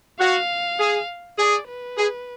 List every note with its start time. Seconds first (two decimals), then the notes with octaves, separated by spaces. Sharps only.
0.20 F#4 F5
0.80 G#4
1.38 G#4 D5
1.68 B4
1.98 G#4